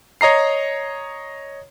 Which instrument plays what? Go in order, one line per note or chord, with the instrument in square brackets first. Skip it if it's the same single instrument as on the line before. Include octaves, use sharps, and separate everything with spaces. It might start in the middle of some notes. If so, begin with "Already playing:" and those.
[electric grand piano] C#5 D#5 A#5 C7